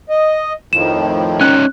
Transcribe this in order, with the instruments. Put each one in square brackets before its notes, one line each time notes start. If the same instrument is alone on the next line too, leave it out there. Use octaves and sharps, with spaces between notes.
[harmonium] D#5
[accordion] F2 A2 F3 [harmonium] D#3 [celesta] E7
[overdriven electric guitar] C#4 D#4 [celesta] F#6